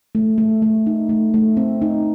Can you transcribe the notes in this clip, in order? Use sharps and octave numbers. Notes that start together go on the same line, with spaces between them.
A3
A3
A3
D#4
A3
A3
C4
D#4